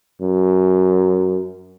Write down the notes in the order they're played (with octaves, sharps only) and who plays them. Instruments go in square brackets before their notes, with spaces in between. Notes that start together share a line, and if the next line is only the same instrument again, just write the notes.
[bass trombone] F#2